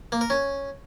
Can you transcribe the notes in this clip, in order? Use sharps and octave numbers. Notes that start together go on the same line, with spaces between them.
A#3
A#4
C#4